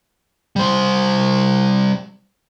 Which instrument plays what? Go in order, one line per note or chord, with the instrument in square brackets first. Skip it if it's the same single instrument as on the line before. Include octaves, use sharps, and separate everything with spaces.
[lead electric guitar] G3 C5